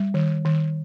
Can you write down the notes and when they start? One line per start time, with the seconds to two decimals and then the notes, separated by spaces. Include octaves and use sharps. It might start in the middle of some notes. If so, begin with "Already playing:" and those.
Already playing: G3
0.14 D#3
0.45 D#3